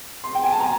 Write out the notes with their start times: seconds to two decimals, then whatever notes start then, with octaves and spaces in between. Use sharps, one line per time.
0.24 C6
0.35 G5
0.43 G#5
0.52 A5
0.60 A#5